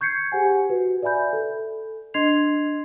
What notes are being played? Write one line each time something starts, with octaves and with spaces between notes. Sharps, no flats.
C#6 G6 G#6 C7 C#7
G4 G#4 C5 F#5 G#5
F#4 B4
D5 E5 G#5 B5 G6
A4
D4 D#5 C6 G#6 C7 F7